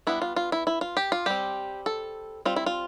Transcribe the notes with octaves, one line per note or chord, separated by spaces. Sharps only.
G3 B3 D4 E4
F4
F4
E4
E4
F4
G4
F4
G3 C4 G4
A4
G3 C4 F4
E4
F4